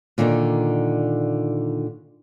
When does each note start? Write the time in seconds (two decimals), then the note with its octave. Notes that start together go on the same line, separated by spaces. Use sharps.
0.18 A#2 D3 D#3 D#4